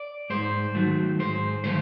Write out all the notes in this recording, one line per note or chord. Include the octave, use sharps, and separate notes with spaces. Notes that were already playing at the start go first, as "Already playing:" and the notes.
Already playing: D5
G#2 C5
D#3 F#3 A3
G#2 C5
D#3 F#3 A3 C5